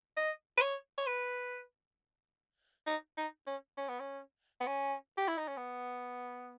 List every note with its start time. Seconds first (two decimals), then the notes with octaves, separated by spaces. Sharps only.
0.17 D#5
0.57 B4
0.61 C#5
0.98 C#5
1.07 B4
2.87 D#4
3.17 D#4
3.47 C#4
3.77 C#4
3.89 B3
4.00 C#4
4.60 B3
4.67 C#4
5.17 G4
5.28 E4
5.38 D#4
5.48 C#4
5.57 B3